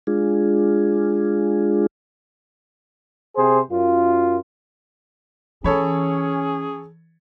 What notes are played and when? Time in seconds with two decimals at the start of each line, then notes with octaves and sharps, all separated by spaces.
0.07 G#3 D4 F4 G#4
3.36 C3 G#4 C5
3.71 F#2 F4
5.64 E3 C#4 G#4 A4 C#5 B5